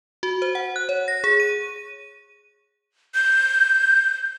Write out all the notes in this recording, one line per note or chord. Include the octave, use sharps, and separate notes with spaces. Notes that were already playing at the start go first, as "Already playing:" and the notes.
F#4
C5
F#5
F#6
C#5
A#6
G#4
D#7
G6